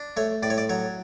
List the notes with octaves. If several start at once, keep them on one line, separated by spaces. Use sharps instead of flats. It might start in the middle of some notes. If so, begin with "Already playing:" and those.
Already playing: D4
A3 C#5
A2 D5
C#5
D5
F#3 C#5